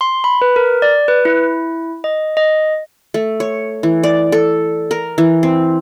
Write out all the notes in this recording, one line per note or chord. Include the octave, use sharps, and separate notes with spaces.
C6
B5
B4
A#4
D5
B4
E4
D#5
D#5
A3
C#5
E3
D5
A4
A#4
E3
C4